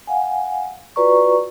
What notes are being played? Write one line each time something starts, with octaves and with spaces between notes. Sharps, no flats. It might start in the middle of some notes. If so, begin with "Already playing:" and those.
F5 F#5 G#5
F4 F#4 B4 D5 A#5 C#6